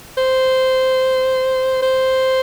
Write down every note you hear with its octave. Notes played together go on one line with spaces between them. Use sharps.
C5
C5